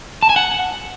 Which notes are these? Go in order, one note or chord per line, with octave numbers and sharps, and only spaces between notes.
A5
G#5
F#5